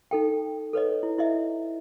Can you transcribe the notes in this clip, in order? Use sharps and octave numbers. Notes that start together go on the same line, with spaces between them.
D#4 A4 G5
A4 B4 C#5 D#5
E4
E4 D#5 E5